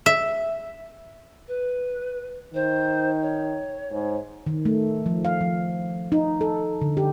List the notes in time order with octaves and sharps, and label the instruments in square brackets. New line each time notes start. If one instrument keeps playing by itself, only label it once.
[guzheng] E5
[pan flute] B4
[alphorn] D#3 [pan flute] C5
[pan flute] C#5
[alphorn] G#2
[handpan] D#3
A3
F3
F5
F3
D#4
A4
D3
G4